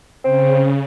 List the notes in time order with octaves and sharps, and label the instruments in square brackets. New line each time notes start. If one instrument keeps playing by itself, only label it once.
[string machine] C#3 [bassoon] C4